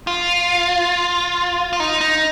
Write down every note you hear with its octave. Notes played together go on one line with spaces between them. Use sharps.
F4
F4
D#4
D#4